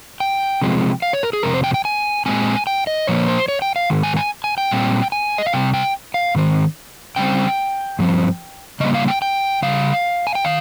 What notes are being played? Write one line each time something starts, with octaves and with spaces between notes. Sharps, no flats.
G5
C3 F3 G#3 C4
F5
C#5
A#4
G#4
F2 C3 A#4
C5
G5
G5
G#5
A#2 G#3 C4 G#5
G5
D#5
A#2 F3 A#3 C#5
C5
C#5
G5
F5
G#2 D#3
G#5
G#5
G#5
G5
A#2 G3 C4
G#5
D#5
F5
C3 G3 C4 G5
G5
F5
G#2 D#3 C4
C#3 G3 C4 G5
G2 F3 C4
C#3 G3 A#3 D#5
F5
G5
G5
C#3 G3 F5
G#5
G5
D#3 F5